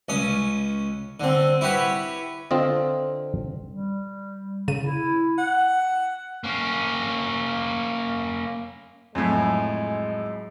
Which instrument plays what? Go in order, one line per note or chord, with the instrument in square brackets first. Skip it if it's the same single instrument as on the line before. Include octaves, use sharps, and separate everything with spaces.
[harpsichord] C#2 C#4 D#6
D3 C4
E4 F#4 G4 B4 C#5
[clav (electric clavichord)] D3 C4 F4 D#5
[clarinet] G3
[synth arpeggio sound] C#3 D#7
[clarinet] E4
[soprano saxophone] F#5
[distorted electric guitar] A#3 C#4
[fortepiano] F2 A2 [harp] F#3 G#5 [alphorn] G#3